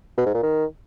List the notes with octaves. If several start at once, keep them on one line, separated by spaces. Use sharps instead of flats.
B2
G#2
A#2
D#3